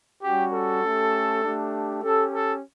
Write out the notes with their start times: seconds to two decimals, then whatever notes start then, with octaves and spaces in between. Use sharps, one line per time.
0.24 G3 C#4 F#4 G4
0.53 A4
0.83 A3 C#4 G4
1.43 A3 D4 G4
2.03 C#4 G4 A4
2.33 A4